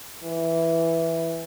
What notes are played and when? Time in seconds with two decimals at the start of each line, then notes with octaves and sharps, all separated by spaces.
0.23 E3